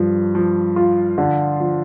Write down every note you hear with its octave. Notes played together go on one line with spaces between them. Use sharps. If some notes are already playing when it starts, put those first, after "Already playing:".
Already playing: G2 F3
F3
F4
D3
F3